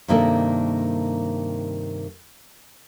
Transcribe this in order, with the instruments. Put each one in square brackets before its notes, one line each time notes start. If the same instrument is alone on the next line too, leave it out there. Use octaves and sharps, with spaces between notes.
[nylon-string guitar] G2 C3 D#3 A#3 A4 D5